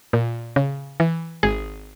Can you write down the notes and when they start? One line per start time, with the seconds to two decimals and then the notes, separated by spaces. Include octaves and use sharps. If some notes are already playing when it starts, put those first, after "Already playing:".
0.13 A#2
0.56 C#3
1.00 E3
1.43 G#1 G#4